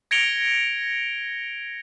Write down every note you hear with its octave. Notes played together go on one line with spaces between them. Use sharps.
G#6 A#6 C#7 D7 F7 G7